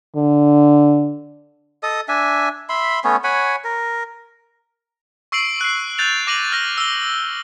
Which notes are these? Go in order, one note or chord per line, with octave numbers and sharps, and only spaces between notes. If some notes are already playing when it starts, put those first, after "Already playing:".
D3
A4 D#5 D#6
D4 E5 G#5
E5 B5 C6
A3 B3 C#4 C#5
C#5 F#5 G#5 B5
A#4
C#6 E6 C7 D7 F#7
F#6 C7
F#6 G6 A6 F7
D6 A#6 D#7 F7 F#7
F6 A6 A#6
E6 G7